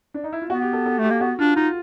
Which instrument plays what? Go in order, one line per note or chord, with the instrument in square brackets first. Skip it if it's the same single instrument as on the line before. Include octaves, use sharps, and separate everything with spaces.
[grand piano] D4
D#4
E4
F4
[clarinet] B3 [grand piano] F#4
[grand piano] G4
A4
A4
[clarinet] A3 [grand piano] G4
[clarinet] A#3
[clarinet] B3 [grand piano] F#4
[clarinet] D4 [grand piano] F4
[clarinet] D#4 [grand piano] F4